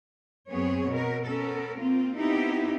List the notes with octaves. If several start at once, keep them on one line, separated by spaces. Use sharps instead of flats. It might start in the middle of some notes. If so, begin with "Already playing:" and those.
F#2 B3 C4 G#4 C#5
B2 A#4
B3 C#4 A4 A#4
A#3 C4 F4
B3 C4 D#4 E4 G4